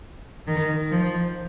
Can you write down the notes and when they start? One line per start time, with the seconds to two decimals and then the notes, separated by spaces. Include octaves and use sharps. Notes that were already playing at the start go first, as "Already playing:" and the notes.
0.47 D#3
0.92 F3